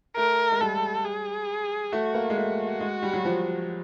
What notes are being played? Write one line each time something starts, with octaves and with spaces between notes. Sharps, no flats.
A3 A#4
G#3
G3 A4
G#4
A3 F#4
A#3
G#3
A3 F#4
G#3
G3
F#3
F3